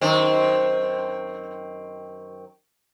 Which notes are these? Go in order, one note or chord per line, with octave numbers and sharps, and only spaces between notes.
F#2 D#3 C4